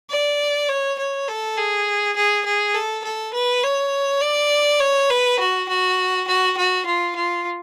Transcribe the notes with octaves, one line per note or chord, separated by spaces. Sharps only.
D5
C#5
C#5
A4
G#4
G#4
G#4
A4
A4
B4
C#5
D5
C#5
B4
F#4
F#4
F#4
F#4
F4
F4